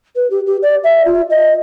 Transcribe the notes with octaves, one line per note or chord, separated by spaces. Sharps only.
B4
G4
G4
D5
E5
F4
D#5